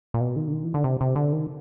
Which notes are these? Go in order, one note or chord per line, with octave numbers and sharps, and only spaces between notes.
A#2
B2
D#3
D3
D#3
E3
D3
C3
C3
D3
D#3